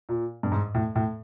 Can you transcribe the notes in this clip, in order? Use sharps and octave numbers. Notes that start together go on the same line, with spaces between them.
A#2
G2
G#2
A2
A2